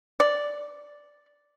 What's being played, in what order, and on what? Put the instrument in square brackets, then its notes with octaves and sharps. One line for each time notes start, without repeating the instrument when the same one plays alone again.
[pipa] D5